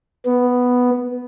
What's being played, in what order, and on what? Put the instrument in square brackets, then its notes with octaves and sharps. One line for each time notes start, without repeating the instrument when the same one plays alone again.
[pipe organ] B3